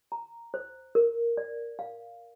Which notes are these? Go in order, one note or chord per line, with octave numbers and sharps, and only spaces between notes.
A#5
C5
A#4
D5
F5